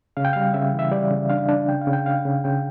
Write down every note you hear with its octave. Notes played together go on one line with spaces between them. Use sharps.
C#3 F5
G5
G3 F5
C#3 E5
E3
E5
G3 D5
C#3
D4 F5
D4
C#3 G5
F5
C#3
G5
C#3 F5
C#3
C#3 G5